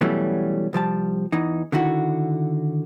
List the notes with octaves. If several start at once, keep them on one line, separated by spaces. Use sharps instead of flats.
B2 E3 F#3 G3 A3 C#4
C2 F3 G3 A5
E2 E3 D#4
D3 D#3 E4 F#4